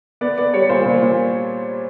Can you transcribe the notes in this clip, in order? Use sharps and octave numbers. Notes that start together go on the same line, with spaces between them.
B3 D5
B3 D5
G3 C#5
A#2 C5
A#2
A#2